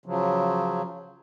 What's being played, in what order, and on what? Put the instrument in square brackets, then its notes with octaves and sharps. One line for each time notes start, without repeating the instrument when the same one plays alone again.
[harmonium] C#3 F3 F#3